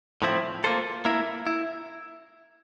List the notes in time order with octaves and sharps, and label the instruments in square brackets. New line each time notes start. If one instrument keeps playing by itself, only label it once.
[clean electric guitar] A2 F3 C4 E4
A#3 F4 A4 C5
A#3 E4 A#4
E4